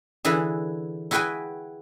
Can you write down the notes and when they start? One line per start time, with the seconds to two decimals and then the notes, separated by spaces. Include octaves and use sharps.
0.25 D3 E3 E4 G#4
1.11 E4 F#4 G#4 B4 G5 G#5